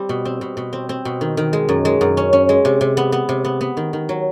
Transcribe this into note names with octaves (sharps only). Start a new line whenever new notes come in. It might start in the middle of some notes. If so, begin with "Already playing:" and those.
Already playing: G3 C4
B2
C4
B2
B2
C4
C4
B2
D#3
D#3
G#3
F#2
G#3
F#2
C#4
C#4
G#3
C3
C3
B3
B3
C3
B3
B3
D#3
D#3
F#3